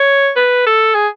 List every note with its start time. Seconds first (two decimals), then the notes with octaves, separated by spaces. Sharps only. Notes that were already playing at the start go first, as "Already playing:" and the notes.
Already playing: C#5
0.36 B4
0.66 A4
0.95 G#4